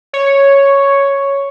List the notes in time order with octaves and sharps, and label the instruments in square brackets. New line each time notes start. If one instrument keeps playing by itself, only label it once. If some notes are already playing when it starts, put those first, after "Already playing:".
[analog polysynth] C#5